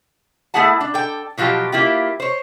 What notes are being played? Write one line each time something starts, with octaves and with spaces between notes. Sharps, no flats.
A3 B3 E4 G#4 F#5 A5
D4
A4 G5
B2 F3 F#3 F4 G4
A#3 E4 F4 G4
C5 C#5